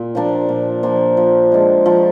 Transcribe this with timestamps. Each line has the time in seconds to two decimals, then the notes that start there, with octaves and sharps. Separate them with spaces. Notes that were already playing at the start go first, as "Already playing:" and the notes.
Already playing: A#2
0.15 F3 A#3 D4
0.49 A#2
0.83 F3 A#3 D4
1.17 F3
1.52 G#3 D4
1.86 F3